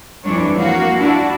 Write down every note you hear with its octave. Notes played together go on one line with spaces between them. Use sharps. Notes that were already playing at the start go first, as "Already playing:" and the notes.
F2 E3 G3 D4 C#5
A#3 F#4 F5
D4 E4 F#4